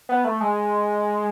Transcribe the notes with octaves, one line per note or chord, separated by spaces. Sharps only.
B3
A3
G#3